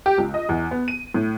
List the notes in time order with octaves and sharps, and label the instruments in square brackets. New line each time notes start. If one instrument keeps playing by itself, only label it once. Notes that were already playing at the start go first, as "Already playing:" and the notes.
[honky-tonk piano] G4
C#2
D#5
E2
B3
D#7
A2